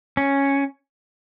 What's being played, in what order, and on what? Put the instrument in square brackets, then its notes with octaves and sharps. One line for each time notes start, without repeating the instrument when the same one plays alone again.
[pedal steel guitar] C#4